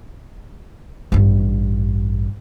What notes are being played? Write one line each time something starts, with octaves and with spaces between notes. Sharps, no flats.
A1 G2